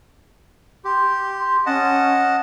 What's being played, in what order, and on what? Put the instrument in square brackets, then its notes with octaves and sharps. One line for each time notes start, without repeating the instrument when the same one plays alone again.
[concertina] G4 [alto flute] C6
[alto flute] C#4 [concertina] D#5 F#5 A5